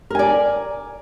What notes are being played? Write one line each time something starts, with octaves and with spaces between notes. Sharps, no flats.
A#4 D5 G#5